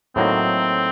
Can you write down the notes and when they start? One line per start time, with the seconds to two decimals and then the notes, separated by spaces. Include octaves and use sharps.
0.16 A2 F#3 A#3 C4 D#4